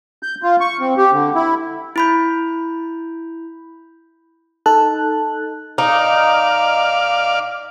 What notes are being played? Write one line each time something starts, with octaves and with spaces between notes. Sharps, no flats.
G6
F4
C#6
C4
G4
D3
E4
E4 B5 G6
D#4 A4 A5 F#6
D#4 D5 F5